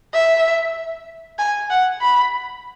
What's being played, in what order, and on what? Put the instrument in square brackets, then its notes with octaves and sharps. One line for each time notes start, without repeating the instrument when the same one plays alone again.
[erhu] E5
G#5
F#5
B5